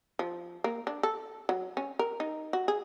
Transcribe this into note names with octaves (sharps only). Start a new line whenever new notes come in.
F3
A#3
D4
A4
F#3
C#4
A#4
D#4
F#4
G#4